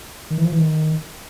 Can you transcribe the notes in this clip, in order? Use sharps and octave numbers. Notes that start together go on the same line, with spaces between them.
D#3
E3
F3
E3
D#3